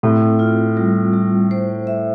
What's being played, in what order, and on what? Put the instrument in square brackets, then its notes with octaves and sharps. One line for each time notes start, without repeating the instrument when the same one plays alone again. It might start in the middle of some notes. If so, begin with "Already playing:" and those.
[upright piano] A2 [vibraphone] C4
[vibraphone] F4
G3
G3
C5
E5